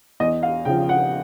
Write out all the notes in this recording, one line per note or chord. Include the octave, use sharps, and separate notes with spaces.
E2 D#5
F5
C#3 F3 G5
F#5